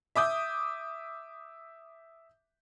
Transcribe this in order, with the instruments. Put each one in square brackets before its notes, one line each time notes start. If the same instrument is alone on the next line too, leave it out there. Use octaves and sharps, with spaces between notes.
[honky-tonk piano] E5 D6 D#6 G6